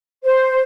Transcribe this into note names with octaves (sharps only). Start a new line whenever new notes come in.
C5